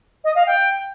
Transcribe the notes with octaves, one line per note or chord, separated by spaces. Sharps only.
D#5
F5
G5